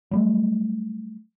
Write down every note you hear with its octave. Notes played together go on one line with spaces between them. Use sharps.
F#3 G3 A3